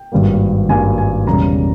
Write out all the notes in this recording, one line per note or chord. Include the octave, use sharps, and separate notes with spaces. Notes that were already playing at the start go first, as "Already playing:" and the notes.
Already playing: G5
G#1 G2 G3 A#3
G#1 G2 G3 A#3 G#5
G#5
E1 E2 C#3 G3 A#3 A#5